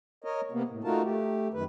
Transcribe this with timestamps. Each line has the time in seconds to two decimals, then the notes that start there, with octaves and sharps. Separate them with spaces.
0.24 A#4 C#5 D#5
0.52 C3 A#3 B3
0.69 A2
0.84 A3 D#4 F4 F#4 A#4 A5
1.03 A3 G4
1.54 F#2 D#3 B4